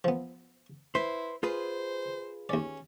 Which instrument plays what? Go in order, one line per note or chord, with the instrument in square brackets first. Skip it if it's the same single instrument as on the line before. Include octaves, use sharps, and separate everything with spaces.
[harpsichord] F3 B3
[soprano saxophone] E4 [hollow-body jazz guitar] B4 C5 [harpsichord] B5
[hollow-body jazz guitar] F4 G#4 B4 [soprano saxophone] C5
[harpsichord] D#2 D5 [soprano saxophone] C#4